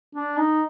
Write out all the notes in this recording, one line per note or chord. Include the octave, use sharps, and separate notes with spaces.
D4
D#4